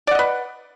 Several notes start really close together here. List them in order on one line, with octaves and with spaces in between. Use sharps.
D5 F#5 D#5 B4